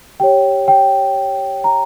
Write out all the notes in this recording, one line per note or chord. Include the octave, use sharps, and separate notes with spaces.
G4 C#5 G5
G5
A#5